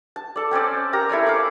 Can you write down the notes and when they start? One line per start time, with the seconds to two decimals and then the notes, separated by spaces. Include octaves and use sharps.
0.16 A5
0.36 A4 D5
0.51 C4 C#4 C5 D5
0.93 G4 A#4 A#5
1.09 E4 A4 D5 G#5
1.26 F5 D6